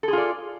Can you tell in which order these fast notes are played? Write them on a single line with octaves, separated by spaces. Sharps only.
A4 G#4 F4 D5